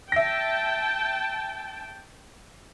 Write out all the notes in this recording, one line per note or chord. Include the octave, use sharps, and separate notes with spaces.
E5 G5 A5 A#6